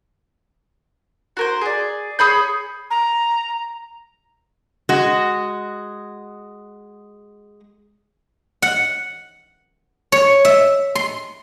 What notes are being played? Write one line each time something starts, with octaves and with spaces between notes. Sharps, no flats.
F#4 A#4 C5
G#4 D5
G#4 C#5 B5 G6
A#5
G#3 F#4
F#5
C#5
E5
C6